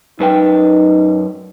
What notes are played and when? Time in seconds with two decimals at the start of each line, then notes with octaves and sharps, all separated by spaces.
0.20 F#2 D#4 B4 G5